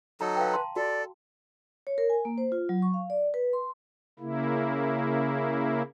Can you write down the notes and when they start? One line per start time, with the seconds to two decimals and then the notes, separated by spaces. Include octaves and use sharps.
0.21 F#3 D#4 A4 A#5
0.36 B4 F5 G5
0.54 A5 C6
0.76 F#4 A4 D5
1.87 C#5
1.98 A#4
2.10 G#5
2.25 A#3
2.38 C5
2.52 F4
2.69 F#3
2.82 C#6
2.94 F5
3.10 D5
3.34 B4
3.53 C6
4.19 C#3 A#3 E4